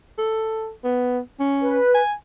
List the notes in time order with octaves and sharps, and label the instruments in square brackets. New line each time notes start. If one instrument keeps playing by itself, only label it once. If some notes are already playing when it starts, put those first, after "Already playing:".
[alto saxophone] A4
B3
C#4
[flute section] B4
[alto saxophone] G#5